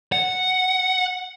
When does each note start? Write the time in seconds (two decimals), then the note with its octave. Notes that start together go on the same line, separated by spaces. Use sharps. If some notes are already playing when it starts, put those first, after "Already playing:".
0.12 F#5